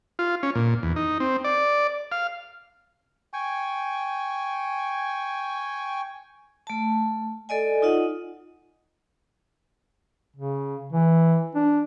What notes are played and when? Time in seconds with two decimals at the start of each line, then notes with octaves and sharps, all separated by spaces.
0.19 F4
0.43 C#4
0.55 A#2
0.83 E2
0.96 D#4
1.20 C4
1.44 D5
2.12 F5
3.33 G5 G#5 C#6
6.67 A3 A5
7.49 A4 D5 D#5 G#5
7.82 D#4 F4 D#5 F#5
10.36 C#3
10.92 E3
11.55 D4